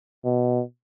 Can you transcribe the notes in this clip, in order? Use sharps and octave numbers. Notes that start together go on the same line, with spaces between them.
B2